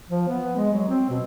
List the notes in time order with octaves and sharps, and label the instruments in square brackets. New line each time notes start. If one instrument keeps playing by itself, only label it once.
[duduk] F3
B3
G#3
F#3
C4
B2